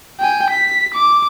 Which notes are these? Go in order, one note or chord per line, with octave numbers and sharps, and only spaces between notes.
G5 G#5
B6
D6